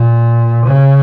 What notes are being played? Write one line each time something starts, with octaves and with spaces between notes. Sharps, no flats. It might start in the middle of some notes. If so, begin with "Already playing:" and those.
Already playing: A#2
C#3